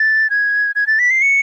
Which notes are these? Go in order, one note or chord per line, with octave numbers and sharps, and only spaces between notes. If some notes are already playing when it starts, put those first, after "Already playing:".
Already playing: A6
G#6
G#6
A6
B6
C7
C#7